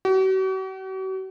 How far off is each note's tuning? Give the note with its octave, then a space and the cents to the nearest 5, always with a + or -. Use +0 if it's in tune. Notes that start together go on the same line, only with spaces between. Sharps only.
F#4 +45